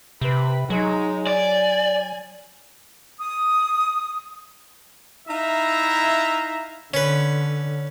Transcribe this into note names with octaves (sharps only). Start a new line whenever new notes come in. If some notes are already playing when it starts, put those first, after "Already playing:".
C3 B4
F#3 G#3 D#4
D5 G#5
D#6
D#4 E4 E5 F5 A#5
D3 C#4 B4